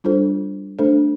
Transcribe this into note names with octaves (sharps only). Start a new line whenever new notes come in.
G3 D4 F4 A4 C5
A3 D4 A4 C5